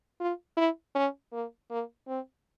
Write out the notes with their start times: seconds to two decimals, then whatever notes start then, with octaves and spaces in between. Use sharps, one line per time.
0.20 F4
0.57 E4
0.95 C#4
1.33 A#3
1.71 A#3
2.08 C4